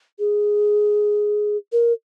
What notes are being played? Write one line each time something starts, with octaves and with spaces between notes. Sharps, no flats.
G#4
A#4